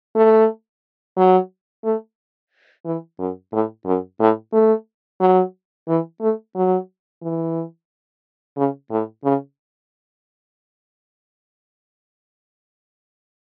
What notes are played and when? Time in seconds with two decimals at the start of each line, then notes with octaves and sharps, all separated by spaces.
0.15 A3
1.17 F#3
1.84 A3
2.85 E3
3.19 F#2
3.52 A2
3.86 F#2
4.20 A2
4.53 A3
5.20 F#3
5.88 E3
6.21 A3
6.55 F#3
7.22 E3
8.57 C#3
8.91 A2
9.24 C#3